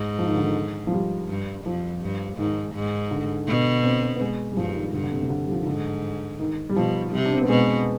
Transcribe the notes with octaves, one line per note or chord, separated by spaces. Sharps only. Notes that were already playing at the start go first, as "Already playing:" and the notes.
Already playing: G#2
F3
D#3
D3
D#3
F3
G3
G2
F2 F3
G2
G#2 D#3
G#2
D3
B2 D3
C4
B3
G#3
G3
G2 F3
F3
D#3
G2 D3
D3
C3
C3
D3
G3
F3
D#3
G#2 D3
D#3
G3
B2 F3
C3 G3
D4
C4
B3
B2 G#3